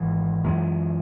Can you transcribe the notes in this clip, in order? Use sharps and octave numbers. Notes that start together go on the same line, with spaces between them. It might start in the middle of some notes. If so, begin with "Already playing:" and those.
Already playing: G#1 G#2 E3
F#2 E3 G#3